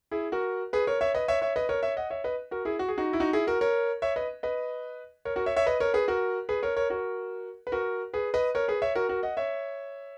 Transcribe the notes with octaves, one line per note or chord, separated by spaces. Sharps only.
E4 G#4
F#4 A#4
G#4 B4
A#4 C#5
C#5 E5
B4 D#5
C#5 E5
C#5 E5
B4 D#5
A#4 C#5
C#5 E5
D#5 F#5
C#5 E5
B4 D#5
F#4 A#4
E4 G#4
F#4
G#4
D#4 F#4
E4
D#4 F#4
E4 G#4
F#4 A#4
A#4 C#5
C#5 E5
B4 D#5
B4 D#5
A#4 C#5
F#4 A#4
C#5 E5
C#5 E5
B4 D#5
A#4 C#5
G#4 B4
F#4 A#4
G#4 B4
A#4 C#5
A#4 C#5
F#4 A#4
B4
F#4 A#4
G#4 B4
B4 D#5
A#4 C#5
G#4 B4
C#5 E5
F#4 A#4
F#4 A#4
D#5 F#5
C#5 E5